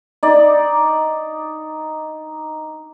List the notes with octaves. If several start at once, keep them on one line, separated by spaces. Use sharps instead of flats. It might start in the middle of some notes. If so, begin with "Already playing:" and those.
D#4 D5